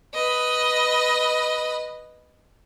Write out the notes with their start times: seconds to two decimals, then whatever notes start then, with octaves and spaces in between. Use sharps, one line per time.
0.14 B4 D#5